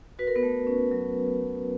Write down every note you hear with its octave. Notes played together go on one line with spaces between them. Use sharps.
F#4 B4
A#4
B3 B4
A3
C#4
F#3